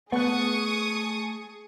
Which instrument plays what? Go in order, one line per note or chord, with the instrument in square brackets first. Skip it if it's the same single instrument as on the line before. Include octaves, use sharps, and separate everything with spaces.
[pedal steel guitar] A3 F#6 [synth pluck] B3 [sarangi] G#4 [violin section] C#6 D#6